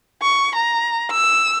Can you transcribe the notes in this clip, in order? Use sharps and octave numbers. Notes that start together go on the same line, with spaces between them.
C#6
A#5
E6